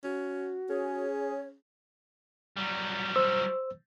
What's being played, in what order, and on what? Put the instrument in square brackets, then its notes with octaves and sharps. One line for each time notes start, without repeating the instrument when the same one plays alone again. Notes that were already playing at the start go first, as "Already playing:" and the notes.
[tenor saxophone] C#4 [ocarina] F#4
[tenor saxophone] C#4 [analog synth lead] G#4 [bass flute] C#5
[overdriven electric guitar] F#3 G3
[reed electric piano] C5 E6